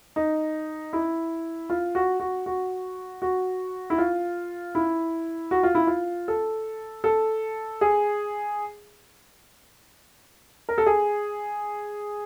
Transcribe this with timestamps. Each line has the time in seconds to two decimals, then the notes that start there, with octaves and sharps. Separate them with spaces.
0.16 D#4
0.93 E4
1.70 F4
1.95 F#4
2.20 F#4
2.46 F#4
3.22 F#4
3.90 E4
3.98 F4
4.75 E4
5.51 F#4
5.63 F4
5.75 E4
5.87 F4
6.28 A4
7.04 A4
7.81 G#4
10.69 A#4
10.78 A4
10.86 G#4